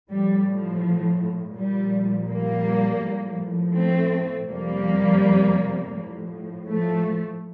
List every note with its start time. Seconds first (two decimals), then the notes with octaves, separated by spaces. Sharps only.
0.10 A2 F3 G3
0.46 F3
1.56 A#2 F3 G3
2.29 G3 A#3
3.01 A2 F3
3.74 A3 C4
4.48 F2 C3 F3 G3 A#3
5.93 A2 F3
6.67 F3 A3